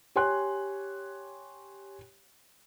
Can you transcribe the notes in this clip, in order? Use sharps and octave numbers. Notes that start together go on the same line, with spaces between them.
G4 C#5 G#5 C6 F#6